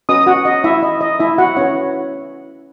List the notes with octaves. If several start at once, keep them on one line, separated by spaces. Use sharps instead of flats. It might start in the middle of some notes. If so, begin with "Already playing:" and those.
C#4 F#4 B4 D#5 D#6
F#4 F#5
D#5
E4 E5
D#5
D#5
E4 E5
F#4 F#5
C#4 E4 B4 C#5